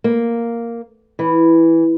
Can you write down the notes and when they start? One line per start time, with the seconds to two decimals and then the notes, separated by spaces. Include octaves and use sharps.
0.04 A#3
1.19 E3